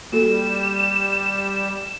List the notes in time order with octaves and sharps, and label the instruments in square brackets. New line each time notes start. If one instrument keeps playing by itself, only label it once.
[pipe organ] G3 [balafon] A#3 F#4 A4 [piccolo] E7